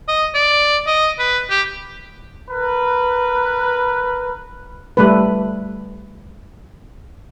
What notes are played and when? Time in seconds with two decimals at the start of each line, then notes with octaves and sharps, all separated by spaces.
0.08 D#5
0.34 D5
0.87 D#5
1.19 B4
1.50 G4
2.50 A#4 B4
4.97 G3 A3 B4